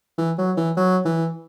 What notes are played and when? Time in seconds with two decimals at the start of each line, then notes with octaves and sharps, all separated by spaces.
0.18 E3
0.38 F#3
0.57 E3
0.77 F#3
1.05 E3